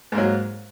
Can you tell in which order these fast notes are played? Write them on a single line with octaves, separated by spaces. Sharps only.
G#2 A#3 F#3